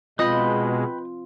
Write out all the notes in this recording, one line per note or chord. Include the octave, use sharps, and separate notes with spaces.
B2 G#3 C4 F4 B4 D#5 G5 B5